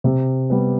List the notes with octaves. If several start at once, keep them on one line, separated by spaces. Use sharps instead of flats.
C3
G3 B3